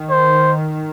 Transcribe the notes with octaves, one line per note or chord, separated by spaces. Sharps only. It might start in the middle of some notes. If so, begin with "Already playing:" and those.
Already playing: D#3
C5